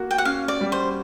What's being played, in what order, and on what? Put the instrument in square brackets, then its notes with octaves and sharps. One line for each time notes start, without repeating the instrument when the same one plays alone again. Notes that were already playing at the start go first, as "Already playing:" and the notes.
Already playing: [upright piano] A#3 F#4
[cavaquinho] G5
F#5
[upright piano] C#4 [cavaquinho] F5
[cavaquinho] D5
[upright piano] G3
[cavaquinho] C5